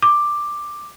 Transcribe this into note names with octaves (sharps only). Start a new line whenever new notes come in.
D6